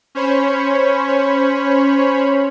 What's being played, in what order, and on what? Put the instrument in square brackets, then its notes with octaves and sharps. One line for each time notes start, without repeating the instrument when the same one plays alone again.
[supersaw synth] C#4 C5 C#5 B5